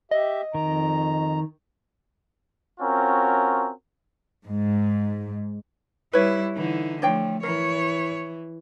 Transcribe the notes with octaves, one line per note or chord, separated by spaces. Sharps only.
G4 D#5 E5
F2 D#3 A#5
C4 C#4 F4 F#4 A#4
G#2
G3 E4 B4 C#5
D3 E3 D#4
F3 A3 D4 C#5 G5
E3 A#4 C#5